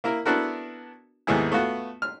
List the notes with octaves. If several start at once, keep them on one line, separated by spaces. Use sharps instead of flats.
A#3 E4 A#4
B3 D4 E4 F#4 A4 A#4
D#2 G#2 A3 B3 E4 G#4
A3 B3 F4 F#4
F6